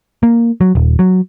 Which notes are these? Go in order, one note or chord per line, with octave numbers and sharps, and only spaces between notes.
A#3
F#3
D#1
F#3